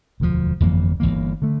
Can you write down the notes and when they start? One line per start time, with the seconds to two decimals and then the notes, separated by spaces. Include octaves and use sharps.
0.20 E1 D2 D3 F3
0.60 G1 F2 E3 A#3
1.00 G1 F2 E3 A#3
1.42 D3 A3